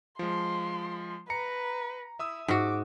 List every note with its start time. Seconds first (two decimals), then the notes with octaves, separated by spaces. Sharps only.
0.19 F3 G#3 C6
1.30 B4 A#5 C#7
2.19 E4 E5 D#6 E6
2.48 G#2 F#4 D6